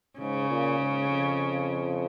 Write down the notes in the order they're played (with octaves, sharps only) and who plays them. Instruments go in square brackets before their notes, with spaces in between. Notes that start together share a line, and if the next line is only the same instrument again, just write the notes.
[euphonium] G#2 [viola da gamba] C#3
[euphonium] A#2
G#2
F2